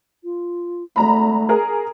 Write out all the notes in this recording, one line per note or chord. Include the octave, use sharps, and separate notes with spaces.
F4
G#1 A3 A#5 B5
G#4 A#4